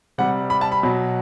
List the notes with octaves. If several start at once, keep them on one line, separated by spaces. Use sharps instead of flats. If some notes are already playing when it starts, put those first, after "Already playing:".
C3 G3 F#5
B5
A5
B5
B2 F#3